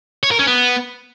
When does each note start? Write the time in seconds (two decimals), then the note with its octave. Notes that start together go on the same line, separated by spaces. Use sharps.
0.23 C#5
0.31 A#4
0.39 C#4
0.47 B3